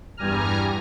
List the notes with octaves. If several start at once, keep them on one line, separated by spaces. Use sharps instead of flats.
E2 G2 G3 G#5 A#5 F6